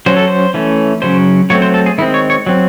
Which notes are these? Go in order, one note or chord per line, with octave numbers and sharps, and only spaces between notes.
F#3 C#4 C5
A4
C5
E3 A3 C#4
C#3 F#3 C#4 C5
F#3 A3 C4 C#5
C5
A4
G#4
D#3 G#3 C4 E4
C#5
C#5
F#3 C4